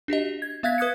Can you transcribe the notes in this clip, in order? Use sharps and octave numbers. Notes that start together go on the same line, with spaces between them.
D4 F#4 G4 D#5
G#6
B3 E5 F5 F#6 G#6 B6
B4 D#6 F#6 G#6 C#7